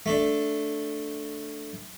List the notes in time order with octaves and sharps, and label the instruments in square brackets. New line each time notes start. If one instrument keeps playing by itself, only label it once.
[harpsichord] A3 D4